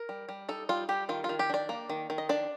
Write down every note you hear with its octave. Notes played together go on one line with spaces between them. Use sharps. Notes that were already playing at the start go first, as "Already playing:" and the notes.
Already playing: A#4
G3
G3
D#4 A4
G3 F4
G3 G4
D#3 F4
F4
D#3
G4
D4 D5
A#3
D#3
D#3
D#5
D4 D5